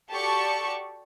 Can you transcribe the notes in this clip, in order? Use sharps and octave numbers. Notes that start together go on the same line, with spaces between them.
F#4 G4 A4 D5 A5 C#6